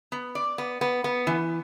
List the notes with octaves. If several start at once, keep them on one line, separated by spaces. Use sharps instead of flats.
B3
D5
B3
B3
B3
E3